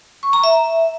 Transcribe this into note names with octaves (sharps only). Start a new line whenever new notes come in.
C#6
A#5
E5